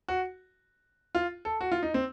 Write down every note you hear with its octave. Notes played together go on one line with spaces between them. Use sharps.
F#4
F4
A4
F#4
F4
D#4
C4